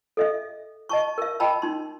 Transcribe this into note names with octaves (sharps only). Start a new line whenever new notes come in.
A4 D#5 E5
D#5 A5 C#6
A#4 E5
D#5 G5 A5 B5 E6
D#4 C6